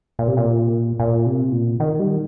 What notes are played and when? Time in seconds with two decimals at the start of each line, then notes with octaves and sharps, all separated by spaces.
0.19 A#2
0.28 C3
0.37 A#2
1.00 A#2
1.26 C3
1.52 A#2
1.80 D#3
1.99 G3